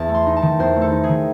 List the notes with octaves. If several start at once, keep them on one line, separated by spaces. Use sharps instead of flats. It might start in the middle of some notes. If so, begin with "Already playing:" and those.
Already playing: E2 A5
A3
C6
D#4
A5
D#3
E2 C5
A3
A4
D#4
G#4
D#3